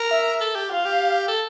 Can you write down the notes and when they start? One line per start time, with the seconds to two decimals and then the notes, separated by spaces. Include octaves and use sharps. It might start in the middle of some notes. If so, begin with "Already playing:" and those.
Already playing: A#4
0.11 E5
0.41 A4
0.55 G4
0.70 F4 F5
0.85 G4
1.28 A4